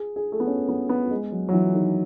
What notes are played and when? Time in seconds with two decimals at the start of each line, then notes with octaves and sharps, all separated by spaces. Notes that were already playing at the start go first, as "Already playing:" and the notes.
Already playing: G#4
0.16 G#4
0.32 A3
0.40 B3
0.47 C#4
0.69 B3
0.89 B3
1.11 G#3
1.32 F#3
1.49 F#3
1.53 E3
1.75 D#3